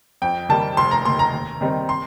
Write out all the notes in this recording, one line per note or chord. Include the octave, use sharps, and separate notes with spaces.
F2 G5
D#3 G3 A#3 A5
F1 C6
A#5
D#2 D#3 C6
A#5
D#2
D#3 G3 C4 D#4
C6